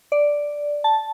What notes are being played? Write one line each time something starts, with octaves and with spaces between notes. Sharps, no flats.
D5
A5